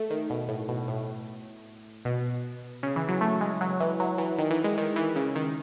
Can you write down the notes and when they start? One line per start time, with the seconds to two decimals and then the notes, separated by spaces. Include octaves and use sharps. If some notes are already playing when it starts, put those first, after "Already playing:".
Already playing: A3
0.10 D#3
0.30 B2
0.48 A2
0.68 B2
0.88 A2
2.05 B2
2.83 C#3
2.96 E3
3.09 F#3
3.21 A3
3.41 G#3
3.61 F#3
3.80 E3
4.00 F#3
4.18 E3
4.39 D#3
4.51 E3
4.64 G#3
4.78 D#3
4.96 E3
5.16 C#3
5.35 D#3